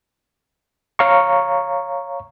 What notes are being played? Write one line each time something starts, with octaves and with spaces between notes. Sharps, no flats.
C#5 F5 A#5 C#6